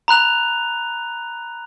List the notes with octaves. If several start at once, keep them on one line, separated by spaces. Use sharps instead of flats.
A#5 B5 F#6 F7